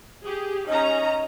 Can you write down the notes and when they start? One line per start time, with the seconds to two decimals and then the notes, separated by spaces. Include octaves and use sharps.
0.24 G4 G#4
0.68 C#4 D#4 D#5 A#5